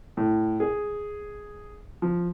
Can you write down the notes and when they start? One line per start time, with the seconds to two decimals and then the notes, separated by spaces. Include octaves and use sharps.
0.17 A2
0.60 G#4
2.02 F3